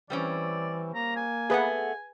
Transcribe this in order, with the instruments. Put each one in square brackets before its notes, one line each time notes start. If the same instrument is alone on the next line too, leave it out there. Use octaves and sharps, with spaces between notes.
[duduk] E3 [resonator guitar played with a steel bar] G3 C4 C#4 [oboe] D5
[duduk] A#3 [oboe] A#5
[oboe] G#5
[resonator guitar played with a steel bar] A3 B3 F#5 [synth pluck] G#4 B4